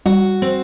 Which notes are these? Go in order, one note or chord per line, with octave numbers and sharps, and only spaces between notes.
G3 F#4
C4